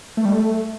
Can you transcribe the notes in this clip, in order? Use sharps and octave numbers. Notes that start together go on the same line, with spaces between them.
A3
G3
A3